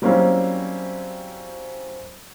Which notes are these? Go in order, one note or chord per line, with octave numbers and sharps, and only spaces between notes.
F#3 G3 A#3 C4 C#4 E4